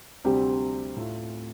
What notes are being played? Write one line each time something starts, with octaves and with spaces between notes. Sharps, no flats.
D2 C3 G3 C4 G4
A2 A3 F4